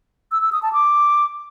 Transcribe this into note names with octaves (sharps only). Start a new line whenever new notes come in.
E6
E6
D#6
A5
D6